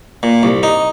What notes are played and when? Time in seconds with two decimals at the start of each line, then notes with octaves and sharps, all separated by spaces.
0.23 A#2
0.43 C2
0.63 D#4